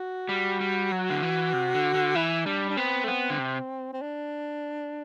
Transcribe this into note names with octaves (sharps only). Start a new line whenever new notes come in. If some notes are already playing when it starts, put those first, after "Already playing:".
Already playing: F#4
G3
G3
F#3
D3
E3
C3
D3
D3
E3 E4
G3 D4
D4
B3 C4
A3
B3
D3
C3
C4
D4